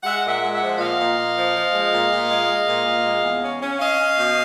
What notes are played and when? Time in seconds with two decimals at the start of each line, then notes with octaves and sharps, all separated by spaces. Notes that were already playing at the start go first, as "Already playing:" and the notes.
0.03 G#3 E5 F#5
0.23 A#2
0.28 E5 F#5
0.41 G#3
0.53 E5 F#5
0.60 F3
0.78 A#2 D#5 F5
0.98 A#2
1.17 A#2
1.35 F3
1.54 F3
1.73 G#3
1.91 A#2
2.10 A#2
2.29 G#3
2.48 G#3
2.67 A#2
2.85 A#2
3.04 G#3
3.23 E2
3.42 C#4
3.61 C#4
3.79 C#4 D#5 F5
3.98 C#4
4.18 B2